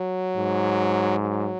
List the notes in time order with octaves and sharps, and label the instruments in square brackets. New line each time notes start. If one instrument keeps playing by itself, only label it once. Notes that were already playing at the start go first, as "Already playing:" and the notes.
Already playing: [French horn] F#3
[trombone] G#2
[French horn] F#3